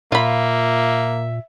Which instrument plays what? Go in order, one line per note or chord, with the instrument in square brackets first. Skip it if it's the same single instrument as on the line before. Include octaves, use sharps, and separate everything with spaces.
[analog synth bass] A#2 [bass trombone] A#3 [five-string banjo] F4 B5 [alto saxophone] E5